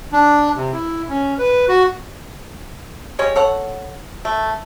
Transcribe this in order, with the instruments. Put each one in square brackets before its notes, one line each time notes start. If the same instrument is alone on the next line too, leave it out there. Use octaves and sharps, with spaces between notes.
[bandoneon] D4
C3
E4
C#4
B4
F#4
[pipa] G3 G#3 C#5
A4 C#5 F#5
A3